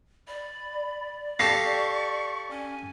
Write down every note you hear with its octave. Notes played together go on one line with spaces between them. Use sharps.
D5 B5
G4 A4 F5 C#6 A#6 C7
C#4 G#5